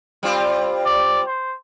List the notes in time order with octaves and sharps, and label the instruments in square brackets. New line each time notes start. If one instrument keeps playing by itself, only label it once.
[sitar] G3 C4 F4
[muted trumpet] D5
C5